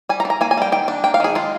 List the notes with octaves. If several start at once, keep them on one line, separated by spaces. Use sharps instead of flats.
G3 G#5
A#5
D4
A#5
A#3 G#5
G#5
G3 G5
D#3 G5
D4
A#3 G5
F5
D#3 G#4
G#3 F4